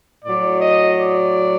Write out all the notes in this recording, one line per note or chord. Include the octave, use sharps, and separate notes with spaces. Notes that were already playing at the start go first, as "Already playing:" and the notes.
A2 F#3 D5
D#5
D5